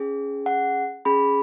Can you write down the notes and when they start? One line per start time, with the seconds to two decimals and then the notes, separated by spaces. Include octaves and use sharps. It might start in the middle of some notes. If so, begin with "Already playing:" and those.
Already playing: C#4 G#4
0.46 F#5
1.05 C#4 G#4 B5